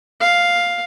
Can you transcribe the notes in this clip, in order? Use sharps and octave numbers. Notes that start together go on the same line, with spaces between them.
F5